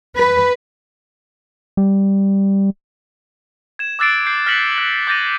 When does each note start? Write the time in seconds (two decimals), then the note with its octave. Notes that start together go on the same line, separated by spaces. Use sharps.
0.16 B4
1.77 G3
3.79 G#6 E7
3.99 D6 E6 F#6 A6 C7 D7
4.26 G6 C7
4.46 F6 F#6 A#6 B6 C#7 F#7
4.78 F#6
5.07 D6 G6 A6 A#6 D#7